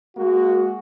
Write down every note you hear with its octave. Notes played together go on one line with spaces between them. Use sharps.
G#3 A#3 F#4